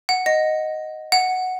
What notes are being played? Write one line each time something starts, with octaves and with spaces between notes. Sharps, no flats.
F#5
D#5
F#5